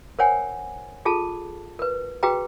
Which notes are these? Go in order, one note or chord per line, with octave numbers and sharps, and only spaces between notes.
A#4 C5 C#5 F#5 G#5
F4 G#4 A4 A5
A#4 B4
F#4 G#4 B4 G5 A#5